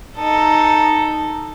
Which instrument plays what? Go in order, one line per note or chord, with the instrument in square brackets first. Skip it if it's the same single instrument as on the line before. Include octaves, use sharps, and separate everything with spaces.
[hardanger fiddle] D#4 A4